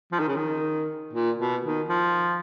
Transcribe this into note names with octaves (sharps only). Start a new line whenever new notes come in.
F3
D#3
C#3
D#3
A#2
B2
D#3
F3